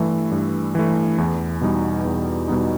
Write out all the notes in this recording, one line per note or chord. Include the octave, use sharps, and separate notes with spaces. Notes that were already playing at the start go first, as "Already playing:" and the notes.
Already playing: G2 E3 A3
G2
E3 A3
E2
B2 G3 B3 D#4
E2
B2 G3 B3 D#4